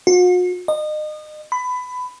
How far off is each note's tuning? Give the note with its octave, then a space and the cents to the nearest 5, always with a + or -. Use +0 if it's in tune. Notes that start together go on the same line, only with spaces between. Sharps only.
F#4 -45
D#5 -30
B5 +20